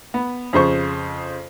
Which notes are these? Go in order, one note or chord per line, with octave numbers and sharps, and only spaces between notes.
B3
F2 C#3 C5 C#6